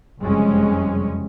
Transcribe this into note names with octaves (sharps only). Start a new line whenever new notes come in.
F#1 F2 C3 G3 G#3 C#4